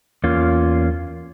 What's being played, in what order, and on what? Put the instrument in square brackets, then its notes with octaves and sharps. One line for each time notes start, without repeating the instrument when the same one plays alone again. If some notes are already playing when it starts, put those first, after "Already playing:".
[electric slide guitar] E2 A#3 C#4 F4